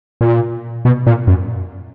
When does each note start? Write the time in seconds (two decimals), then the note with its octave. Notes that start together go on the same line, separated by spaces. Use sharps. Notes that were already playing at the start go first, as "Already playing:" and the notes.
0.21 A#2
0.85 B2
1.07 A#2
1.27 F#2